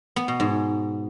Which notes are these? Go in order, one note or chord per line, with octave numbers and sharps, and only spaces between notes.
B3
B2
G#2